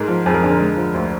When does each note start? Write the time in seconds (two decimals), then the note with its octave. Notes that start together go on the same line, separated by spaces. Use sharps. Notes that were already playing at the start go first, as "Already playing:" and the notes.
Already playing: G#2 G#3 A#4
0.08 F3
0.26 F2 G#4
0.34 A#4
0.43 D3 G#4
0.51 A#4
0.60 G#3
0.77 F3
0.94 D2